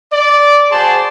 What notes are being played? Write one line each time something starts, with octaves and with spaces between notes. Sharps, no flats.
D5
F#4 G#4 C5 D5 A5 C6